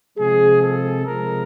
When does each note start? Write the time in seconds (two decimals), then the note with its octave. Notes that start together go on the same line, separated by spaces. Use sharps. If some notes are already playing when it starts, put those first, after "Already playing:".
0.18 C3 F3 G#3 G#4
0.61 A4
1.05 C3 F3 G#3 A#4